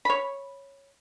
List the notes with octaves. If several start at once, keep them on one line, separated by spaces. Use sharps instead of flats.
C#5 B5